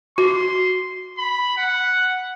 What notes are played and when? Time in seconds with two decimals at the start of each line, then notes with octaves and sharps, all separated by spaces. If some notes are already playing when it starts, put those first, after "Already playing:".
0.18 F#4 C6
1.18 B5
1.57 F#5